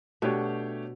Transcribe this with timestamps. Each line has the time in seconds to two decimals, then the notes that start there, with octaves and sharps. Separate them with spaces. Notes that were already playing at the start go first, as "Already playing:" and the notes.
0.22 B2 A3 D4 G4 C#5